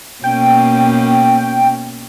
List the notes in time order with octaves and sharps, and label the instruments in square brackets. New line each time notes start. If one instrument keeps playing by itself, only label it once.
[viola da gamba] B2 A#3 C#4 [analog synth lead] G5